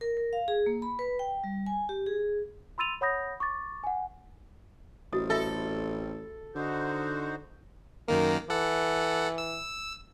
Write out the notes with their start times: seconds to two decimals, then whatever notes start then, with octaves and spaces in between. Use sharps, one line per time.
0.01 A#4
0.17 A#4
0.33 F5
0.48 G#4
0.66 A#3
0.82 B5
0.99 B4
1.19 G5
1.44 G3
1.66 G#5
1.89 G4
2.06 G#4
2.78 B5 C6 E6 A6 D#7 F7
3.01 C#5 F#5 B5 D#6 G6 A#6
3.40 C#6 D6 A6
3.84 F#5 G#5
5.13 A1 G3 C4 F#4 D#5 D#6
5.30 A4 D#5 E5 B5
6.55 D3 D#4 F#4 C5
8.08 F#2 D#3 A#3 A#4
8.50 E3 A4 F#5
9.38 E6